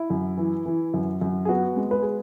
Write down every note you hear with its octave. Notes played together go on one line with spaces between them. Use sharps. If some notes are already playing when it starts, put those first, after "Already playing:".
Already playing: E4
F#2
E3
E3
F#2
F#2
G#4
B3 F#4
G#3
B4
G#4